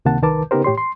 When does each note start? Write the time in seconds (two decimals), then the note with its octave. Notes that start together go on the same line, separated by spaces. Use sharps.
0.05 C#2 C3 D#3 A#3 F#5 A5
0.22 C2 D#3 A#4 B4 A5 D6
0.51 C#3 B3 D#4 G4 A#4 C5
0.64 A2 G4 C#5 C6
0.78 C6